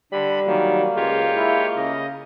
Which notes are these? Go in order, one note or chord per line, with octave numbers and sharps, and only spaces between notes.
D3 G3 B5
D#3 F#3 A#3
C#2 G#3 F4 G4 C#5
E4
C#3 D#5